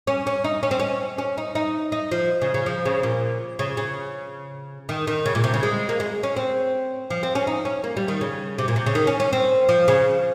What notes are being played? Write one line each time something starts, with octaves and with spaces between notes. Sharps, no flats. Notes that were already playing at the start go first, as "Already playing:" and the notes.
C#4
C#4
D#4
C#4
C4
C#4
C#4
D#4
D#4
D#4
F3
C#3
C#3
F3
C#3
A#2
C#3
C#3
D#3
D#3
C#3
A#2
C3
C#3
G#3
A#3
G#3
C#4
C4
F3
C4
C#4
D#4
C#4
A#3
G3
D#3
C#3
C3
A#2
C3
C#3
D#3
C#4
C#4
C4
F3
C#3